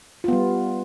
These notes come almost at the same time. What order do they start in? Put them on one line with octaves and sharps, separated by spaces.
F4 B3 G3